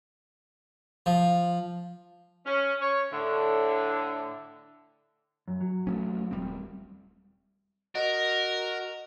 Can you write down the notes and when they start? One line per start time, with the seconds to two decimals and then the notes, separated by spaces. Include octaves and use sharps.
1.06 F3
2.45 C#4
2.81 C#5
3.12 A2 D3
5.48 F#2
5.61 F#3
5.87 A3 B3 C#4
6.31 D#1 G3 C4
7.95 F#4 A#4 D#5